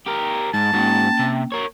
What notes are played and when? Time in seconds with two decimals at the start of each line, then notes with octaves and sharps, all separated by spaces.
0.07 G4 A#4
0.54 G#2 A5
0.73 G#2 A#3 C#4 F#4 G5
1.19 C3
1.52 A#4 C#5